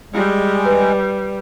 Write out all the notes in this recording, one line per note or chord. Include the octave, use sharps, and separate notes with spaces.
G3 G#3
B4